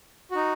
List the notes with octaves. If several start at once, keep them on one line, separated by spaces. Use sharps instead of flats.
D#4 F#4